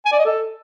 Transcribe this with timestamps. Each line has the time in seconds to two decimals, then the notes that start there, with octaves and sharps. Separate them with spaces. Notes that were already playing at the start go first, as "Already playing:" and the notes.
0.06 G#5
0.12 D5
0.19 D#5
0.25 A4